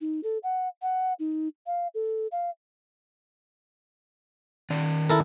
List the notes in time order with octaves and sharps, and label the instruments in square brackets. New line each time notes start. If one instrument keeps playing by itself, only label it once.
[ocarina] D#4
A4
F#5
F#5
D#4
F5
A4
F5
[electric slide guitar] D#3 D5
[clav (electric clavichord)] E4 A4 A#4